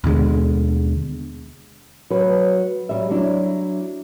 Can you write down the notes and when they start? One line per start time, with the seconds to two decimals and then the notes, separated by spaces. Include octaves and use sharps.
0.04 D#2 B2 D3 G#3
2.10 F#3 B4
2.89 F#3 G3 E5
3.10 F#3 D4 E4